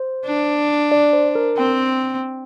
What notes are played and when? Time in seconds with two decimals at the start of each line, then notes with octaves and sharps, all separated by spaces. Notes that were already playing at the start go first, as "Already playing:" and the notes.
Already playing: C5
0.26 D4
0.92 D5
1.13 C5
1.35 A#4
1.57 C4 G5